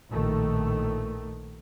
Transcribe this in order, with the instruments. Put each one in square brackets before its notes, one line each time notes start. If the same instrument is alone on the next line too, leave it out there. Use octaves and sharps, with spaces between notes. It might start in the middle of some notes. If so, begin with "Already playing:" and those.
[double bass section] A#1 A2 D#3 A3